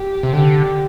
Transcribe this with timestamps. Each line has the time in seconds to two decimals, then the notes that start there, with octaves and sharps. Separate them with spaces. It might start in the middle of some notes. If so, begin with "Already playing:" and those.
Already playing: G4
0.23 C3
0.33 D3 G4